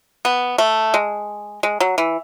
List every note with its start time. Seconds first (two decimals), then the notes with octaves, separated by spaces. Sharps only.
0.25 B3
0.58 A3
0.94 G#3
1.63 G#3
1.80 F#3
1.98 E3